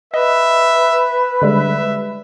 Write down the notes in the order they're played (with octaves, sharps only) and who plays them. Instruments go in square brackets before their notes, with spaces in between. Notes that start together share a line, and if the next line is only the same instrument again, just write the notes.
[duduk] B4 [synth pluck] D#5 [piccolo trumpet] E5
[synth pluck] D3 G3 G#3 [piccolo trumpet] E5